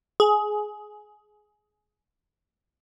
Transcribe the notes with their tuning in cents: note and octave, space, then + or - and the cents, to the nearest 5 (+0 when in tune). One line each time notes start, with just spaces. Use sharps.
G#4 +15